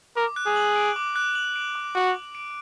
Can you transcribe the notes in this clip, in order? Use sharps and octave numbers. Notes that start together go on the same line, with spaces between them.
A#4 D6
F#6
G#4
F#7
D7
D6
F#6
F#7
D7
D6
F#4 F#6
F#7
D7